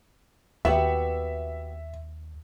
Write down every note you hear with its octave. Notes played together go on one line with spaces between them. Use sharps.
D#2 B3 F#4 G4 E5